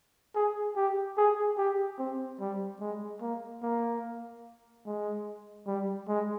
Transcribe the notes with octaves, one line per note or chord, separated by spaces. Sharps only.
G#4
G4
G#4
G4
C4
G3
G#3
A#3
A#3
G#3
G3
G#3